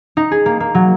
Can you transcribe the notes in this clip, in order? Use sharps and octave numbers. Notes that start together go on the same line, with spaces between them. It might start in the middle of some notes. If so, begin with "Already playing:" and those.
D#4
G#4
A#3
A#3
F#3